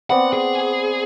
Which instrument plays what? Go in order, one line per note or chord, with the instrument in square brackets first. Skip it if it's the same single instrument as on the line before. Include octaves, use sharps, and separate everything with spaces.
[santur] B3 C4 D5 [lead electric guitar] F#5
[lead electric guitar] G#4